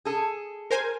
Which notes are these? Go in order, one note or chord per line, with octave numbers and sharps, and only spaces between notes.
G#4 A4
A#4 C5 G#5